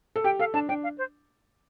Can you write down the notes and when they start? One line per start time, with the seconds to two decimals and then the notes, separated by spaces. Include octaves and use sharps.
0.16 A4
0.24 G4 G5
0.39 A4 F5
0.54 D4 A5
0.69 D4 G5
0.83 F5
0.98 C5